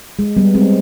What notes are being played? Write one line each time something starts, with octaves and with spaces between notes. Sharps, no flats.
G#3
G3 B3
G#3 C4